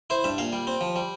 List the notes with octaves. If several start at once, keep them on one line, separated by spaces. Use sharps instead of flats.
E4 C5
G2 E5
A#2 F5
G3
C4
F3
G3